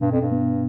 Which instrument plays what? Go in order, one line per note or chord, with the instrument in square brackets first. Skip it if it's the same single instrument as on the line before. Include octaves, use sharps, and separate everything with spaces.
[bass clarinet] G2 [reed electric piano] B2
[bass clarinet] F2
G2
[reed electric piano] B3